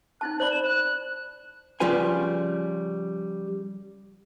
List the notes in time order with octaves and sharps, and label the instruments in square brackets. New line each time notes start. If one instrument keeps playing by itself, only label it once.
[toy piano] D#4 E4 A5 [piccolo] F#6
[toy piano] C5 D5 B5 [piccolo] F#7
[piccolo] E7
F#6
[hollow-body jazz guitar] C#3 F3 G3 F4 B4 G#5